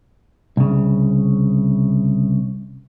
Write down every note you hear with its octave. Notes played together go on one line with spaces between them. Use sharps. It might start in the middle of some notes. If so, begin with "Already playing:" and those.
C2 C#3